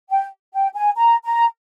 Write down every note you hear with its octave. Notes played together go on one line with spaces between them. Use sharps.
G5
G5
G#5
A#5
A#5